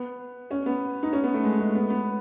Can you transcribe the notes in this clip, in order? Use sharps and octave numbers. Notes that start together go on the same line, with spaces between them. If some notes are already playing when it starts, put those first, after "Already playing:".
Already playing: B3
C#4
B3
D#4
C#4
B3
A3
G#3
G#3
B3
B3